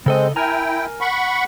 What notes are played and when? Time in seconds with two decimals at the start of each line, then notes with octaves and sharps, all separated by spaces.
0.06 C#3 G#3 C4 A4 D#5
0.36 E4 A#4 G5 G#5 A#5
1.01 F#5 B5 C#6